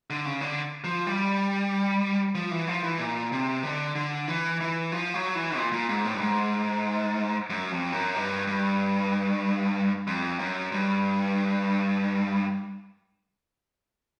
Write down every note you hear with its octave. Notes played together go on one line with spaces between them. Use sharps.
D3
C#3
D3
F3
G3
F3
E3
F3
E3
A#2
C3
D3
D3
E3
E3
F3
F#3
E3
A#2
A#2
G#2
A2
G2
G#2
F#2
F2
F#2
G2
G2
F2
F#2
G2